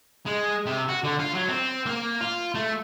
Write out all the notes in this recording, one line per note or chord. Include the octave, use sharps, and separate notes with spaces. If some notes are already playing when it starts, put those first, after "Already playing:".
G#3
C3
F#4
D3
F4
F#3
C4
A#3
F4
A3